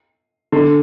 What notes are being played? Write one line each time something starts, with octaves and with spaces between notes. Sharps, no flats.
D3